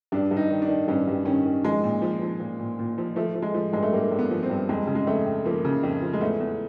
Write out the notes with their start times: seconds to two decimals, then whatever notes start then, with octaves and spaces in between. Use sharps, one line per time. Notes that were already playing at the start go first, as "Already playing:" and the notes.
0.12 G2 D4
0.31 G2
0.36 D#4
0.50 D#3
0.62 D4
0.68 D#3
0.88 G2 C#4
1.08 G2
1.25 D#3 C#4
1.45 D#3
1.64 F3 G#3
1.84 A#2
2.02 F3
2.22 F3
2.40 A#2
2.59 A#2
2.79 A#2
2.98 F3
3.16 F3 A3
3.35 F3
3.42 G#3
3.54 F3
3.73 G2 G#3
3.82 A3
3.93 G2 A#3
4.11 G2
4.19 B3
4.31 F3
4.43 C4
4.50 G2
4.69 F2 G#3
4.87 C#3
4.95 G#3
5.06 F2 A3
5.26 F2
5.46 F3 A#3
5.65 C#3
5.83 F2
6.02 F3
6.13 G#3
6.21 E2 A3
6.40 E2